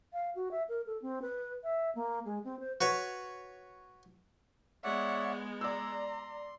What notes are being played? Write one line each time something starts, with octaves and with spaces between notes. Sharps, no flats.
F5
F#4
E5
A#4
A4
C4
B4
E5
A#3
G#3
C4
C5
F#4 B4 C#5
G#3 B3 C#5 D5 E5 F#5
D5 A#5 C6 E6